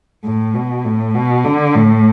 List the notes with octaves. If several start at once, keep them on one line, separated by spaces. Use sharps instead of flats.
A2
B2
A2
B2
D3
A2